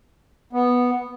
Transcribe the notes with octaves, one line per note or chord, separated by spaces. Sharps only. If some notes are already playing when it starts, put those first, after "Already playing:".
B3